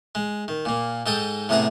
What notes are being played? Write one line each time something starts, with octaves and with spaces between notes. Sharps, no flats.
G#3
D#3
A#2 A#3
G#2 D#4 A4 G5 A5 D#6
A2 C3 B3 G#4 F#5 A#5